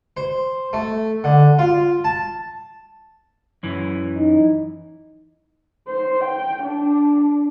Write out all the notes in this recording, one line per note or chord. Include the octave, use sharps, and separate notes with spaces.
C5
A3
D3
F4
A5
F#2 E3
D#4
C5
G5
D4